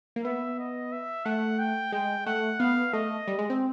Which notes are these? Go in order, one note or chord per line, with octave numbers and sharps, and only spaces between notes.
A#3
B3 E5
D#5
E5
A3 F#5
G5
G#3 G5
A3 F#5
B3 F5
A3 D#5
G3
G#3
C4